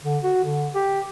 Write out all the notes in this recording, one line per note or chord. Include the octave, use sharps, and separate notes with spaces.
D3
F#4
D3
G4